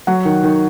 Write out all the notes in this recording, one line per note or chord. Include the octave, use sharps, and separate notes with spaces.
F#3 F#5
D#3
D#3